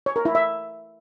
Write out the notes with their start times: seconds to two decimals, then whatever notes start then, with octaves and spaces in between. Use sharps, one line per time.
0.06 C#5
0.16 A#4
0.25 E4
0.35 E5